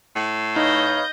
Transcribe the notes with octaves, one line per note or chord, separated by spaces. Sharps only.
A2
D#4 B4 C#5 D#5 F5 G6